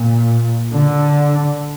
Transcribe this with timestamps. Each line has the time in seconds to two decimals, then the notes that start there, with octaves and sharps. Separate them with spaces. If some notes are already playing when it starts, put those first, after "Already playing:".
Already playing: A#2
0.73 D3